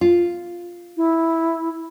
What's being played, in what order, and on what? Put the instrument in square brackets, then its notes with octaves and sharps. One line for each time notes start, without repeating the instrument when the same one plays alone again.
[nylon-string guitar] F4
[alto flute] E4